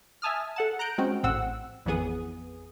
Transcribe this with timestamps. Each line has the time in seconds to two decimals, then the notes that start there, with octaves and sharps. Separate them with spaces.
0.22 E5 G#5 A5 D#6 F6
0.56 A4 F#5 A5
0.79 A#5 F#6 G6 D7
0.98 G#3 C4 C#4 F#4
1.23 A1 A2 C4 F#5 E6
1.86 A1 F2 E3 B3 G#4 D#6